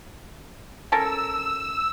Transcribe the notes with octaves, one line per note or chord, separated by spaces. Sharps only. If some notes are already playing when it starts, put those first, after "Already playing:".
C#4 A4 A#4 E6